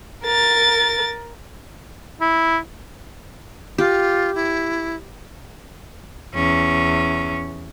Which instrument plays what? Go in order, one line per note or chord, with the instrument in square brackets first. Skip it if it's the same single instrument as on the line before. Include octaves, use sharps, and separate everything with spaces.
[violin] A#4 A6
[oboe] E4
[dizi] F4 [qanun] G4
[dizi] E4
[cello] E2 C#4